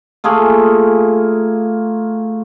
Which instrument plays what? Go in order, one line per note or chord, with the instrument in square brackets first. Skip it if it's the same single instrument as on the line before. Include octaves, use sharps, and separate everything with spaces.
[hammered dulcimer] A3 A#3 F4 G#4